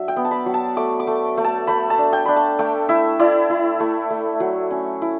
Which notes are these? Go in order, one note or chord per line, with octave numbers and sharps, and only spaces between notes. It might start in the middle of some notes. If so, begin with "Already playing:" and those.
Already playing: F#3 D4 E5
G5
B3
A5
B5
F#3
A5
A3 D6
D6
A3
A3
A5
A3 B5
A5
D4
G5
D4 B5
A5
A3 G5
E4 E5
E4 D5
E4
A3
A3
F#3
C#4
E4